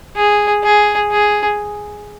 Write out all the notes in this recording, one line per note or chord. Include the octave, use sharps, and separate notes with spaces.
G#4
G#4
G#4